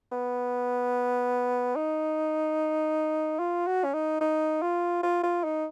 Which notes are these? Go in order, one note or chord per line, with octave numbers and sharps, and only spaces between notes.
B3
D#4
F4
F#4
C#4
D#4
D#4
F4
F4
F4
D#4